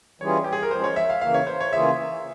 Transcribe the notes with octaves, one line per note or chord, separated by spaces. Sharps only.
E3 G3 C#4 F4 G#4 C#5
G4
G#4
A#4
F3 G#3 C#4 C5
C#5
E5
F5
C#3 E3 A#3 F5
C#5
C5
C#5
C#3 E3 A#3 F4 G#4 E5